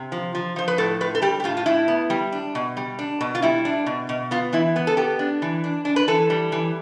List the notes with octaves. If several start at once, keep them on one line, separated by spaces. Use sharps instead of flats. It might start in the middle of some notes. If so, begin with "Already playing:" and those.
Already playing: C3
F3
F3
F3 C5
B4
A2 A4
A2 B4
A4
G3 G4
G4
A2 F4
F4
A2 E4
B3
G3
D4
B2
G3
D4
B2
F4
G3 E4
D4
B2
B2
B3 F4
E3 E4
B3
A4
B3 G4
D4
E3
D4
D4
B4
E3 A4
G3
E3